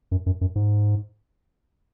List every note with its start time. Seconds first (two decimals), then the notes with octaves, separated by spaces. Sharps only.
0.11 F#2
0.26 F#2
0.41 F#2
0.56 G#2